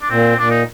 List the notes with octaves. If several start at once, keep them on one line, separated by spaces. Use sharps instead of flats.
D4
A#2 C4
A#2 D4
D#4